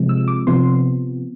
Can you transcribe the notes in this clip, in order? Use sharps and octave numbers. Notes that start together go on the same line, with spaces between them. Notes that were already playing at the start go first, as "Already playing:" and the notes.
Already playing: C3 F3 G#3
E6
D6
C3 F3 B3 C6